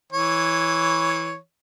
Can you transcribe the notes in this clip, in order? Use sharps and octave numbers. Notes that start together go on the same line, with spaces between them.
E3 C#5